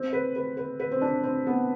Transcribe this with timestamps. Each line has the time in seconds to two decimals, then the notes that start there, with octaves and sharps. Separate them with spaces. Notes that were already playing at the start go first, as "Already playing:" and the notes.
Already playing: C4
0.13 B4
0.36 B4
0.57 B4
0.80 B4
0.92 C4
1.01 D4
1.23 C4
1.47 B3